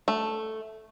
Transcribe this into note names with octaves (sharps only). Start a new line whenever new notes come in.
A3